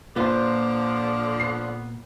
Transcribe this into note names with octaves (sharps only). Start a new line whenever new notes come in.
A#2 D3 F3 F4 B4 C5 D6
B3 C7